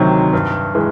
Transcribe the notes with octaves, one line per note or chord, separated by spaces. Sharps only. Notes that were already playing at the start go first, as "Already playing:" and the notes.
Already playing: D2 C3 D#3 F#3
G2
E3 G#3